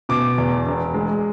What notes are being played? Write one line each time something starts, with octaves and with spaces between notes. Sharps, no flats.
B2 D6
E2
E1
G#3